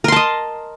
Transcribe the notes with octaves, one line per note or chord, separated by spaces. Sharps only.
A#4 D#5 A5 C6